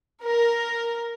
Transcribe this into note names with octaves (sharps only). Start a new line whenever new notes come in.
A#4